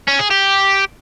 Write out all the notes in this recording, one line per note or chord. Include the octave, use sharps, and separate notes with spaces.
C#4
G#4
G4